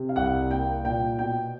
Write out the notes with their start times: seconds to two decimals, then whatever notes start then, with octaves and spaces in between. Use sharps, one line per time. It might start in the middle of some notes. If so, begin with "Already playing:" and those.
Already playing: C3
0.09 F5
0.16 C2 F#5
0.50 A#3 G5
0.84 A#2 G5
1.19 B2 G5